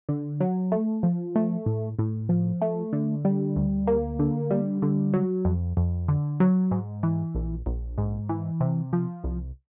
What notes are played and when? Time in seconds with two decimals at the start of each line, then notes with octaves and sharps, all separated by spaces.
0.09 D3
0.40 F#3
0.72 A3
1.03 F3
1.36 A3
1.66 A2
1.99 A2
2.29 F3
2.62 A3
2.93 D3
3.25 G3
3.56 D2
3.87 A#3
4.19 D3
4.51 G3
4.82 D3
5.14 F#3
5.45 F2
5.77 F2
6.08 D3
6.40 F#3
6.71 G#2
7.03 E3
7.35 A#1
7.66 A#1
7.98 G#2
8.29 E3
8.60 C3
8.93 F3
9.24 C2